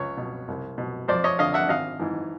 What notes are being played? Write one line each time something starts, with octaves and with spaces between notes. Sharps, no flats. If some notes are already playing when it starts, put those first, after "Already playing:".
Already playing: C#2 C#5
B2
C2
B2
F2 C5 D5
C#5 D#5
D3 D#5 F5
E5 F#5
G#1 D#5 F5
G#2 E3